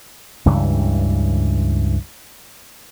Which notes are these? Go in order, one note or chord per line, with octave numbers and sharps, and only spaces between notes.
C#2 G2 C#3 E3